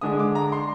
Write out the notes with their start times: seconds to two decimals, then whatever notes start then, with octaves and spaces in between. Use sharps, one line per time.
0.01 D3 G#3 D4 D#6
0.19 D6
0.35 A#5
0.52 C6